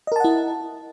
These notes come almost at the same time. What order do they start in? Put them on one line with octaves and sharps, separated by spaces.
D#5 A#4 A5 F#5 E4